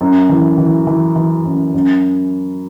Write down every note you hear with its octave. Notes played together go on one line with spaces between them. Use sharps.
F#2
E3
E3
E3
E3
F#2
F#2